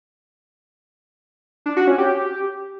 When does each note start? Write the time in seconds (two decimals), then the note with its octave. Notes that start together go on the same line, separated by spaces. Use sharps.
1.66 D4
1.77 F#4
1.87 C#4
1.98 G4